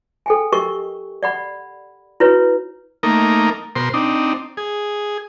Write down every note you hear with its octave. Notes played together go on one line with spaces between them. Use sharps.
A4 G5 G#5
G4 A#4 D#5 C#6
D5 F#5 B5
E4 F#4 B4 C#5
A3 A#3 D#4 A#4
B2 A#4 C5 C6
C4 D4 D#4
G#4